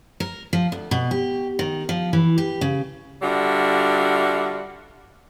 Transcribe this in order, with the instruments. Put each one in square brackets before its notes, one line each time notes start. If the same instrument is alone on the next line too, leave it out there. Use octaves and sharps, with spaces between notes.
[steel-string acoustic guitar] A#4
F3
D2
B2
G4
D#3
F3
E3
G4
C#3
[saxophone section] D3 G3 F4 F#4 E5